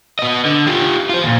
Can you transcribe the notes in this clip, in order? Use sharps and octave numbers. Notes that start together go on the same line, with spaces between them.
B3 D#5
D3
F4 G4
F4 C5
D#2 A#2